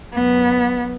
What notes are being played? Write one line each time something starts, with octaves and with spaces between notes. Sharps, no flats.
F#2 B3